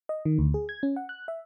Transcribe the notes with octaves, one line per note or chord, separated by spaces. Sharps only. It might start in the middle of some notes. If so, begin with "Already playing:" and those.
D#5
D#3
D2
G#4
G#6
C#4
F#5
F#6
E5